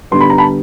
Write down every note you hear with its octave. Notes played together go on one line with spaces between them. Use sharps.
D3 G3 B3 C6
B5
A#5
A5 B5